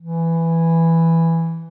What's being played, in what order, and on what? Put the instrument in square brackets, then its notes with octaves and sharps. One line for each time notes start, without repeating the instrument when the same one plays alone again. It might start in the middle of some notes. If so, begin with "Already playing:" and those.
[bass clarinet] E3